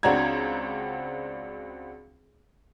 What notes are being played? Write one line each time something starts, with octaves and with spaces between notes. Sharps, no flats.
C#2 C4 D4 F#4 A#5 G#6